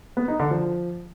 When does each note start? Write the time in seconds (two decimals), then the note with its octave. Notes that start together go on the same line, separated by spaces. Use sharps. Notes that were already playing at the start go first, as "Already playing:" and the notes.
0.17 B3
0.28 D#4
0.39 D3
0.51 F3